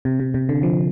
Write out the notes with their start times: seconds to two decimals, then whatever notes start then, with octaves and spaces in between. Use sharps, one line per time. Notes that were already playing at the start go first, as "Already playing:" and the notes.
0.05 C3
0.20 C3
0.34 C3
0.49 D3
0.63 F3